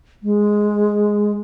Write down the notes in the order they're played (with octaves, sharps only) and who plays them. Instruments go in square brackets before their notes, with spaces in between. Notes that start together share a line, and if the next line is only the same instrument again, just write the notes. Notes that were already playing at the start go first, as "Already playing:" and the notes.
[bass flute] G#3